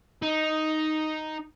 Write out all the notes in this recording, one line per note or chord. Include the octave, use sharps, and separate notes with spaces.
D#4